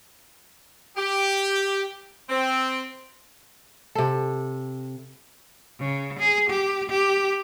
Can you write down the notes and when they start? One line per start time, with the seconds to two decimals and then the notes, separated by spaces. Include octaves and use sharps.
0.97 G4
2.29 C4
3.95 C3 A4
5.80 C#3
6.19 G#4
6.50 G4
6.89 G4